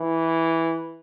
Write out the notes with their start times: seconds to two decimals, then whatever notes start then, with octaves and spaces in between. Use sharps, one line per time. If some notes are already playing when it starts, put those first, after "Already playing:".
Already playing: E3